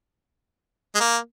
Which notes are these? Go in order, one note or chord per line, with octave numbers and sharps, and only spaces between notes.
G#3
A#3